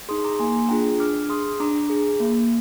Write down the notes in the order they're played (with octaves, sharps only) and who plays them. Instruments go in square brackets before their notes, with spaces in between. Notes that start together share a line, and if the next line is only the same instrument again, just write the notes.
[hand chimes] D#4 G#4 C6 D#6
A#5 D6
A#3 G#5 C6
D4 F4 G#4 G5 A#5
D4 D6 F6
G#4 C6 D#6
D4 A#5 D6
G#4
A#3